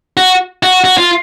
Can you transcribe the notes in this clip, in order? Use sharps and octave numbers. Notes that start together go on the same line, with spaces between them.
F#4
F#4
F#4
F4